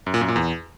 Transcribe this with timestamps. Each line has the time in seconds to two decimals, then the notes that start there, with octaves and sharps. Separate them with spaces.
0.06 F#2
0.14 A#2
0.21 F#2
0.28 A#2
0.36 E2